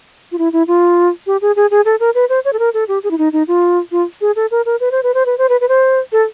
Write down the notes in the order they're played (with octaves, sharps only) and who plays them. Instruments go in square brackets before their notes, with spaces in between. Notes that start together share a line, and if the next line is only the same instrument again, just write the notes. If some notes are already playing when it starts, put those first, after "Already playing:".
[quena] F4
E4
E4
F4
G4
G#4
G#4
G#4
A4
A#4
B4
C5
C#5
A4
A#4
A4
G4
G#4
E4
D#4
D#4
F4
F4
G#4
A4
A#4
A#4
B4
C5
B4
C5
B4
C5
B4
B4
C5
A4